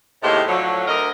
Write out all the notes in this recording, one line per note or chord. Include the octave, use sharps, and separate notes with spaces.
D#2 A2 C3 G#3 G4 C5
A2 D3 F3 F#3
D2 A#4 D#5